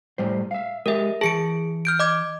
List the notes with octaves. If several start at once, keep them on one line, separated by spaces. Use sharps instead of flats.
A2 G3 C5
E5 F5
G#3 G4 A#4 D#5 E5
E3 G#4 A5 C#7 D7
F6 G6 D7
D#5 D6 G#6